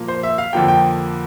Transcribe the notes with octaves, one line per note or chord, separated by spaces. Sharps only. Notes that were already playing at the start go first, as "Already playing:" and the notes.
Already playing: A#2 F3 A#3
C5
E5
F5
F2 D3 F3 A#3 G5
G5